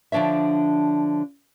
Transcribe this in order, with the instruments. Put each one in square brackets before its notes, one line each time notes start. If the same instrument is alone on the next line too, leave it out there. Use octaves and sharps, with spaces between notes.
[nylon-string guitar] D3 F3 D4 C#5 E5